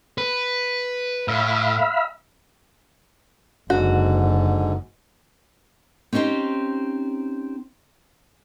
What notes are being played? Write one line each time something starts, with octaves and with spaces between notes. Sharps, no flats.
B4
A2 E5 F5 B5
F#1 G#2 D3 F#4
C4 C#4 D#4 G4 C5